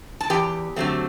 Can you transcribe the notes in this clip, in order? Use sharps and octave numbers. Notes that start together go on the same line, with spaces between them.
A5
E2 G4 G5
D3 F#3 A3 C4